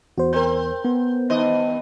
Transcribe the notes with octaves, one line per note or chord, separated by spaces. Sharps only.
E2 F#4 C5
C4 A#4 C5 G6
B3
G2 D#3 C5 D#5